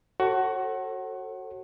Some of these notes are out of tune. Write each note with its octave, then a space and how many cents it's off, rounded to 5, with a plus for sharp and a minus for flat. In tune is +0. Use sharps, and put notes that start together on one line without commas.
F#4 +20 A4 +20 C#5 -40